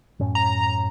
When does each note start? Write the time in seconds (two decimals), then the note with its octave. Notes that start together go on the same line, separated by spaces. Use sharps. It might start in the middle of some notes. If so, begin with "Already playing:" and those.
0.19 F#2 A2 C#4
0.35 A#5